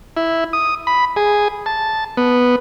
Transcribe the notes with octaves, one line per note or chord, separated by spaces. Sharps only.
E4
D#6
B5
G#4
A5
B3